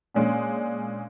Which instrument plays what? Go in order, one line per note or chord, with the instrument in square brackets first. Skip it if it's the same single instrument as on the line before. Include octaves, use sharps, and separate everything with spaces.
[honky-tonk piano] A#2 G#3 C#4 D4